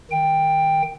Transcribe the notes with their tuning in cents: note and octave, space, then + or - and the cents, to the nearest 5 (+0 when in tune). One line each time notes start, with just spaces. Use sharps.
D#3 +0 G5 +10